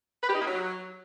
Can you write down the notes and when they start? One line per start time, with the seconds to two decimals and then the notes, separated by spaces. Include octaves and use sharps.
0.23 B4
0.29 G4
0.35 D#4
0.41 A#3
0.46 F#3